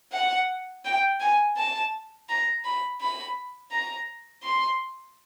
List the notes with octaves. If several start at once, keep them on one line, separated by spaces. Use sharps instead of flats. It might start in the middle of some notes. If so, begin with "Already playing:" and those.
F#5
G5
G#5
A5
A#5
B5
B5
A#5
C6